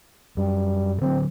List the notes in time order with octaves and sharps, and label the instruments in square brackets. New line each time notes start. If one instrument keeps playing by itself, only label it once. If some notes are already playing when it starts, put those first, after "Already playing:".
[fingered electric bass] F#2 [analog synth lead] G3
[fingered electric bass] D3 F#3 [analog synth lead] C4